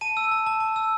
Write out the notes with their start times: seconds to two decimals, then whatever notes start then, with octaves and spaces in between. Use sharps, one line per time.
0.01 A5 D#7
0.17 E6
0.31 A5
0.46 A5
0.60 A5
0.76 E6